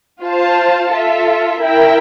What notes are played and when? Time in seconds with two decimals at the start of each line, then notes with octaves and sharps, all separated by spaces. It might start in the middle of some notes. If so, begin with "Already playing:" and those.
0.24 F4 C5 F5 A5
0.93 F4 A4 E5
1.62 E4 A#4 E5 G5